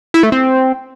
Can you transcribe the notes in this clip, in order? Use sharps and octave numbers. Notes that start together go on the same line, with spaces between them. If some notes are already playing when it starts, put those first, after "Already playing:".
E4
A3
C4